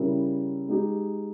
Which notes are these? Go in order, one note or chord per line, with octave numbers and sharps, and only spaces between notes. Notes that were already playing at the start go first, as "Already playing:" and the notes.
Already playing: C#3 G3 C#4 E4 A#4
G#3 D#4 G4